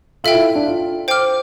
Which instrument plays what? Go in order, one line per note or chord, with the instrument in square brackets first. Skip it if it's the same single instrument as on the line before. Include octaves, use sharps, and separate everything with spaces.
[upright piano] F4 [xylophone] A4 E5 G5
[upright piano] E4
D4
F4
[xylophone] C5 G5 D6 F6